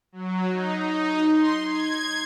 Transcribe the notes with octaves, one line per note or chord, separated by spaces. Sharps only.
F#3
D#4
D#4
C6
G#6